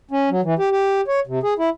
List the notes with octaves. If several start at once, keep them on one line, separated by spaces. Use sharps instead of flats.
C#4
F#3
E3
G4
G4
C#5
C3
G#4
E4